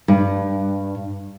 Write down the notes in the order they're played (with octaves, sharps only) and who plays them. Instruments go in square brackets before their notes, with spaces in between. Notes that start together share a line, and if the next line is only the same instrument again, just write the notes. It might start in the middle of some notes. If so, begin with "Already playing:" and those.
[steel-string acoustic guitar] G2